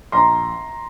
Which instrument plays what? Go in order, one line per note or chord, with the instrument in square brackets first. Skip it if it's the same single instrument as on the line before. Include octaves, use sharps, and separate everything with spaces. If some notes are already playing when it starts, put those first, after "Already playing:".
[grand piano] A#1 A#5 C6